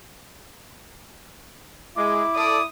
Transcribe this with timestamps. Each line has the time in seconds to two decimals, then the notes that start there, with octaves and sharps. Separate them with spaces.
1.96 G#3 E4 D6
2.36 A4 D5 D#6